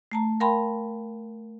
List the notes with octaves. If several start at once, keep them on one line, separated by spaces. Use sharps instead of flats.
A3 A5 A#5
A#4 F5 G5 A5 B5 C6